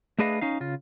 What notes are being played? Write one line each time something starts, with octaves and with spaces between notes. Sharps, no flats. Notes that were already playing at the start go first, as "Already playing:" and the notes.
A3 D4 G#4 B4 D#5 F5
C#4 D#4 F5
C#3 F4